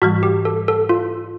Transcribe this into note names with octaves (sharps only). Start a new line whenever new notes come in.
G#2 E3 G3 F#4
G4
A4
A4
F4